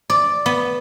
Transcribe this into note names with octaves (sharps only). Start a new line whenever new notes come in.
D5
B3